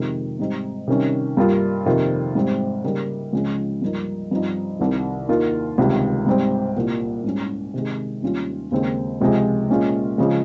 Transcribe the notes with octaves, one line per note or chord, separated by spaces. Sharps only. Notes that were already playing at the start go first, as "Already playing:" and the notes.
Already playing: F2 C3 D#3 G#3
G#2 G3 C4 D#4
C3 D#3 G3 C#4
G2 G3 A#3 F4
F2 C3 D#3 A#3 F4
G#2 G3 C4
C#3 G3 A#3 D#4
C#2 C#3 F3 G#3 C#4
G2 F3 A#3 D#4
G2 F3 C4 D#4
C2 C3 D#3
D#2 D#3 A#3 F4
C#2 C3 D#3 G3
G#2 G3 C4
C2 A#2 G3 A#3
G#2 G3 C#4
C3 D#3 G#3
D#2 D#3 G3 C#4 F4
D#2 C#3 G#3 C4 D#4
C#2 C3 F3 G#3
A#2 G#3 C#4 F4
C#3 F3 G#3